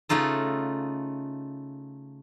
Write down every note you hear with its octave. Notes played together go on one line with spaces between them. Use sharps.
C#3 A3 D#4 F4 A4